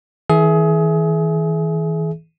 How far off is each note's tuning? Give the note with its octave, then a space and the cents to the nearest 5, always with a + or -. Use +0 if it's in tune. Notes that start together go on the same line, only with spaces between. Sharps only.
E3 -40 G#4 +25 E5 +0